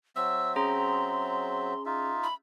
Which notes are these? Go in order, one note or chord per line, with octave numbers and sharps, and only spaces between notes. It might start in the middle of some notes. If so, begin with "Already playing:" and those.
F#3 C4 E5 E6
C#4 G#4 A#5 C6
D#4 F4 E5
B5